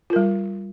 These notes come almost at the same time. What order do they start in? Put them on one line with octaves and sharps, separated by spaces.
F4 A#4 G3